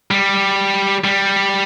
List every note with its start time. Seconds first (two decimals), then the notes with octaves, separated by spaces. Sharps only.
0.11 G3
1.04 G3